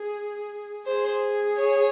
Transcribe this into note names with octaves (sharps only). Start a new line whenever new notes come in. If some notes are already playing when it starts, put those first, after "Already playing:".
Already playing: G#4
G#4 C5
C#5